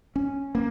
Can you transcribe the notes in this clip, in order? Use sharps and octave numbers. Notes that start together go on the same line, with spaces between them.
C#4
A#3